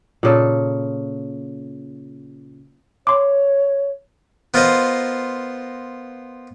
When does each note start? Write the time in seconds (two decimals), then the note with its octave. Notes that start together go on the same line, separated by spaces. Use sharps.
0.23 A#2 C#3 A4
3.07 C#5 C6 D6
4.54 B3 F4 A#4 C5 D#5 A#5